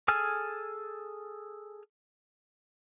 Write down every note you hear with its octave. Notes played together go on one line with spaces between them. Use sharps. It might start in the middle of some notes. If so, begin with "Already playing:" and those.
G#4 A4 G#5 F6